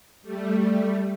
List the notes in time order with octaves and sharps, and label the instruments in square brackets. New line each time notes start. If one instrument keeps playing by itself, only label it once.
[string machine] G3 A3